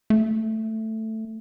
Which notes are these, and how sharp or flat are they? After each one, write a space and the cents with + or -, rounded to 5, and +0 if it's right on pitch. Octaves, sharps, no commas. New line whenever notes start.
A3 +5